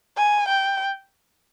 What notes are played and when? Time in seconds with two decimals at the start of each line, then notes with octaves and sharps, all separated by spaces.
0.17 G#5
0.49 G5